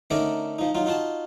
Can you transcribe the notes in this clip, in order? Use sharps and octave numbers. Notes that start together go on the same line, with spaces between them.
D3 A3 C#4 D#4 A#4 D5
F3 D#4
F#3 D#4 F4
D#4 F4 F#4 A5